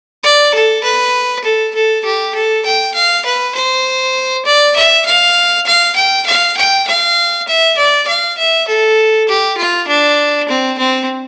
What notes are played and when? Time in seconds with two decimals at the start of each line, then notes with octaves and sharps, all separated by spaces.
0.24 D5
0.55 A4
0.84 B4
1.44 A4
1.75 A4
2.05 G4
2.35 A4
2.66 G5
2.95 F5
3.26 B4
3.55 C5
4.46 D5
4.76 E5
5.06 F5
5.67 F5
5.96 G5
6.27 F5
6.57 G5
6.88 F5
7.48 E5
7.77 D5
8.08 F5
8.38 E5
8.68 A4
9.29 G4
9.58 F4
9.88 D4
10.49 C4
10.78 C4